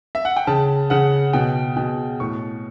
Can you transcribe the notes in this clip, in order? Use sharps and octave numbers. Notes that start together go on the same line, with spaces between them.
E5
F#5
G5
C#3 A5
C#3 F#5
B2 G5
B2 G5
A2 C#6